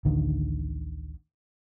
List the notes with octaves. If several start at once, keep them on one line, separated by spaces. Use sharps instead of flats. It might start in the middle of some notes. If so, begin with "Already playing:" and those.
A1 D2 D3 D#3